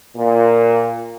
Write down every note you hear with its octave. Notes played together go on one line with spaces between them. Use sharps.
A#2